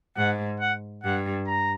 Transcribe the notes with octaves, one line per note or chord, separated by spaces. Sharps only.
G#2 F#5
F#5
G2 F#5
A#5